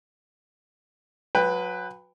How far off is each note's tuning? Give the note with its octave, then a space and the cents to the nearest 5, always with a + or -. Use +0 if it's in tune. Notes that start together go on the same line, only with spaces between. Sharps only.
F#3 -25 B4 +5 G5 +30